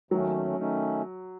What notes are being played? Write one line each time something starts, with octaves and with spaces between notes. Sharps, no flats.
D#2 D#3 F#3 A3 C#4
D#3 A3 C#4